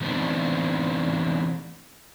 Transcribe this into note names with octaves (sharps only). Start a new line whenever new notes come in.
E3 A3 B3 C4 D4 D#4